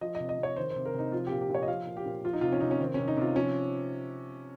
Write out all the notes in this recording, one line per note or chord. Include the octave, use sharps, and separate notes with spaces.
F3 D#5
D#5
C3
D#5
C3 C#5
D#3 C5
C5
C3
A#4
C3 D#4
F3 F4
A#2 G4
G4
A#2
C#5
D#5
F3 F5
A#2
G4
A#2
F3 F4
D#4
C3 F4
C#4
C3 D#4
C#4
D#3 C4
C3 C#4
D#4
C3 F4
F3 C#4